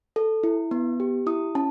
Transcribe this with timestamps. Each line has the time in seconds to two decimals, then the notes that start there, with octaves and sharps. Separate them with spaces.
0.16 A4
0.44 E4
0.71 B3
1.00 G4
1.27 E4 D#6
1.55 C#4 A5